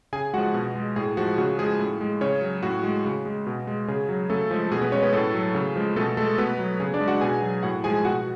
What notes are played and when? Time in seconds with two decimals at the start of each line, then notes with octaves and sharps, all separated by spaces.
0.13 C#3 G#4 G#5
0.33 F3 G#3 F#4 F#5
0.54 B2
0.75 G#3
0.96 A2 G#4
1.17 F3 G#3 F#4
1.38 C#3 F#4
1.58 F3 G#3 G#4
1.79 A2
2.01 G#3
2.21 C#3 C#4 C#5
2.42 F#3
2.63 A2 F#4
2.83 G#3
3.05 C#3
3.26 G#3
3.47 B2
3.67 G#3
3.88 C#3 G#4
4.09 F#3
4.30 C#3 A3 A4
4.51 F3 G#3
4.72 B2 G#4
4.82 B3 B4
4.92 G#3 C#4 C#5
5.02 B3 B4
5.13 A2 A3 A4
5.34 F#3
5.55 C#3
5.76 F3 G#3
5.96 B2 A3 A4
6.17 G#3 A3 A4
6.38 B2 B3 B4
6.59 F#3
6.80 C#3 G#4
6.94 D4 D5
7.00 G#3
7.08 F#4 F#5
7.21 B2 G#4 G#5
7.42 F#3
7.63 A2 F#4 F#5
7.84 F3 G#3 G#4 G#5
8.05 B2 F#4 F#5